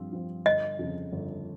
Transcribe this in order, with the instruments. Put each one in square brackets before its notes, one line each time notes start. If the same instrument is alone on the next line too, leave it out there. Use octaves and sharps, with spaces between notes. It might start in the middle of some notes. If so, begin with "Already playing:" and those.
Already playing: [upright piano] G2 F3 C4 F4
F3 C4 F4
[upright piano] G1 [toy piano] D#5
[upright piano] F2 C#3
G1